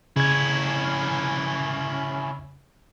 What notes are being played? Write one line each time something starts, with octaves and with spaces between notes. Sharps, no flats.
C#3 C#4 E4 G#6